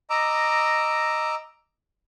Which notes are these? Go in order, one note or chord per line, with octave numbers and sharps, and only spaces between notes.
D#5 A#5 D6 E6